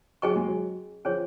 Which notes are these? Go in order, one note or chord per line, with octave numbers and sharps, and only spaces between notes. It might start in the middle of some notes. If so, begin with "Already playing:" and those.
F#3 C#4 G#4 D#5 G#5 C#6
G#3
F#3
F3 C#4 G#4 C#5 G#5